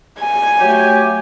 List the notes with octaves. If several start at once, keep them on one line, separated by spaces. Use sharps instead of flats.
G#5
F#3 A3 G4